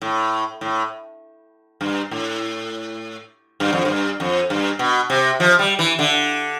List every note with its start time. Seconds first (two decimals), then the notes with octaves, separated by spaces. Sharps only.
0.02 A2
0.61 A2
1.81 G2
2.11 A2
3.60 G2
3.73 F2
3.85 G2
4.20 F2
4.50 G2
4.79 B2
5.10 C3
5.40 F3
5.59 G3
5.79 E3
5.99 D3